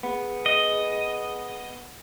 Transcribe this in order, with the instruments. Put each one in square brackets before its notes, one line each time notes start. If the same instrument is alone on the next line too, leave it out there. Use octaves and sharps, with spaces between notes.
[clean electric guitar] B3 [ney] G#4
[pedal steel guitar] D#5